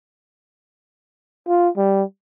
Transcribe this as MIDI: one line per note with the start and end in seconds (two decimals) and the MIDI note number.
1.48 1.69 65
1.77 2.03 55